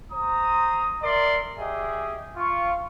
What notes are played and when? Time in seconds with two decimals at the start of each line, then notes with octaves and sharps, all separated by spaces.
0.12 C5 A#5 D#6
1.03 A#4 D5 E5 C6
1.58 G4 G#4 D#5 E5
2.37 F4 C#6